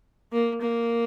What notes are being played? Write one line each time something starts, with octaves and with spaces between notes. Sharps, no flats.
A#3
A#3